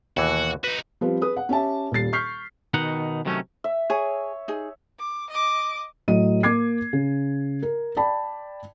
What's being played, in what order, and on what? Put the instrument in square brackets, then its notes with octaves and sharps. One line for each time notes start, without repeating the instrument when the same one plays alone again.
[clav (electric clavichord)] D#2 B2 E3 [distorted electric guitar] F#4
[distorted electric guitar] D#4 F#4 [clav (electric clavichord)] B4
[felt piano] F3 G3 C4 B4
G#4 B4 D#6
F#5
C#4 G4 E5 A5
D#1 A#2 G3 A6 C7
C#6 F6 G6 B6 C7
[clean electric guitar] B2 D#3 D#4 F#5
C3 D#3 F#3 A3 C4 C#4
[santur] E5
[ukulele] G#4 [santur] C#5
[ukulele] D#4 G#4
[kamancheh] D6
D#5 D6
[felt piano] A2 F#3 D#5 D#7
A#3 D6 G#6 C7
C#3
A#4
D5 G5 A5 B5